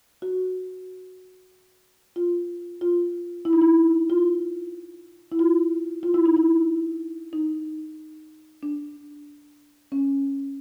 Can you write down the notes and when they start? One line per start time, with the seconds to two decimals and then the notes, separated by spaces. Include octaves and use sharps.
0.22 F#4
2.16 F4
2.81 F4
3.45 E4
3.53 D#4
3.61 E4
4.10 F4
5.32 E4
5.39 F4
6.03 F4
6.14 E4
6.26 D#4
6.36 E4
7.33 D#4
8.63 D4
9.92 C#4